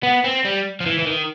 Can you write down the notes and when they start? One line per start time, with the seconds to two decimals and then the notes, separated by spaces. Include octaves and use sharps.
0.03 B3
0.24 C4
0.45 G3
0.80 F3
0.86 E3
0.99 E3
1.07 D#3